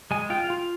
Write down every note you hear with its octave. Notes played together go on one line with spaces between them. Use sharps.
G#3 G#5
F4 G5
F5
F4